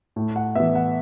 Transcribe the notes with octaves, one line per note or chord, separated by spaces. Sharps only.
A2
F#5
E3 B3 E5
F#5